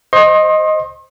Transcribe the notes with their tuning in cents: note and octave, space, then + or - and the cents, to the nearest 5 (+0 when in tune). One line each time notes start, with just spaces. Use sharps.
C5 +0 D#5 +0 C6 +35